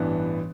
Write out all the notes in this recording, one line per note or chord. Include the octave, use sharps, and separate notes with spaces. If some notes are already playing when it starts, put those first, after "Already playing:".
Already playing: A1 G2 E3 B3 D4